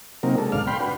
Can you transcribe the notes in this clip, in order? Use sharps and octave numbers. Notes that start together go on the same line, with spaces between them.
C3 F#3 A#3 C4 D#4 A#4
G#3 D4 A4
D2 G#2 B2 D5 F5 F6
G5 B5 C6
D4 F#4 B4